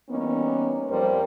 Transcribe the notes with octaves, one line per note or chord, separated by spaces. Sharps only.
E3 G3 A#3 B3 C#4 D#4
F2 G3 A#4 C5